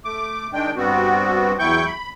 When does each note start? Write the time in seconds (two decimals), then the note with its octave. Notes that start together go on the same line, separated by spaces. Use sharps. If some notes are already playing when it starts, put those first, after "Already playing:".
0.05 A3 D6
0.53 D#3 G#3 D4 G5
0.77 G2 G3 B3 C4 F#4
1.59 E2 F#3 E4 G5 C#6 G6
1.86 B5